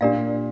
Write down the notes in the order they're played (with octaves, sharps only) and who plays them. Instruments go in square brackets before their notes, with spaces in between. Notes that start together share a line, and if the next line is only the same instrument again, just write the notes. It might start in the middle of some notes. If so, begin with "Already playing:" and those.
[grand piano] A#2 [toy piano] D4 G4 A#4 D5 F5